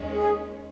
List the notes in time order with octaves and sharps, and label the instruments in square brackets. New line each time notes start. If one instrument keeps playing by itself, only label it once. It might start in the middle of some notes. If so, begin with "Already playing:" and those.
Already playing: [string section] D#2 D#3 G#3 C#4
[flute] G#4